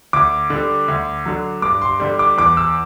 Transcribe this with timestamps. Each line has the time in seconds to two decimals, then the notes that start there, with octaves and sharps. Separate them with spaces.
0.13 D2 D6
0.50 D3 G3
0.88 D2
1.26 D3 F#3
1.62 G2 D6
1.82 C6
2.00 D3 G3
2.19 D6
2.37 E2 D6
2.57 E6